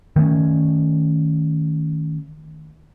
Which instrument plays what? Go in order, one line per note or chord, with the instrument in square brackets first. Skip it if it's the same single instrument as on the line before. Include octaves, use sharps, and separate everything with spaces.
[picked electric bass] D#3 A3 A#3 C#4